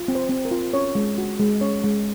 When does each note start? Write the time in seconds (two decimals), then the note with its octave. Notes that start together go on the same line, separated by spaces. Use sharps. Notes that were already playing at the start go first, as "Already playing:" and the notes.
Already playing: F4
0.08 C4
0.15 C5
0.29 C4
0.45 A#4
0.51 F4
0.73 C#4 C#5
0.95 G#3
1.18 F#4
1.39 G#3
1.61 C#4 C#5
1.84 G#3